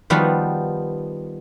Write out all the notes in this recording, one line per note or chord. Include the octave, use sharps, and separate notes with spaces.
D#3 F3 G3 B3 F#4